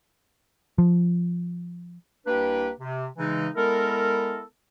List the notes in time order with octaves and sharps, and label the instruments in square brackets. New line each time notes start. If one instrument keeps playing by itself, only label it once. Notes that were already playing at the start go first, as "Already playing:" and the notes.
[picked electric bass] F3
[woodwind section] C2 A#3 D4 G4 B4
C3
C#3 E3 G#3 D#4
G#3 B3 E4 A4 A#4